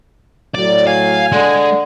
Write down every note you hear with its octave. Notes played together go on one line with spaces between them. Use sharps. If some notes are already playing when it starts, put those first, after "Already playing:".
A2 F#3 D5
F5 G#5
D3 G#3